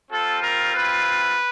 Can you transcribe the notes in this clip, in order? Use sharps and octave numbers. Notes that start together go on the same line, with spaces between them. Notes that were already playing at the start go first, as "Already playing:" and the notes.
G3 C4 F4 A4
A#4
B4